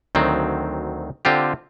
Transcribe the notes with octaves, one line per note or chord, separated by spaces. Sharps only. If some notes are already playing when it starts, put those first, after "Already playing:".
D2 D#3 F#3 C4
D3 C4 F4 G4